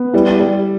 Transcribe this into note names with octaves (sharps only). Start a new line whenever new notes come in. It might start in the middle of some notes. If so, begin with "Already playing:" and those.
Already playing: B3
G3 E4
G3